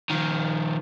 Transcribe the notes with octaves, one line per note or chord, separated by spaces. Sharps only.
D#3 F3